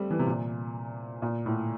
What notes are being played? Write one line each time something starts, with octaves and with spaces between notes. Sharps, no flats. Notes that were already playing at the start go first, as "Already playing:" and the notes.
Already playing: G3 A3 C4
E3
C3
A#2
A#2
A2